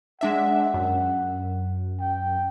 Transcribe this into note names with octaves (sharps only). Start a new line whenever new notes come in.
G#3 D4 E5 F#5
F#2
G5